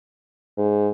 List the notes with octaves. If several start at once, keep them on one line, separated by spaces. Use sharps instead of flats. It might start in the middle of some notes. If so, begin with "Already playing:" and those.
G#2